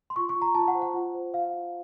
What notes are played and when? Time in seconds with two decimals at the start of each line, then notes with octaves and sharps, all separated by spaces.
0.10 C6
0.16 F4 C#6
0.29 C#6
0.36 F4
0.42 A#5
0.55 F4 A5
0.68 F#5
0.75 C5
0.82 F#5
0.94 F4
1.14 C5
1.34 F4 F5
1.54 F4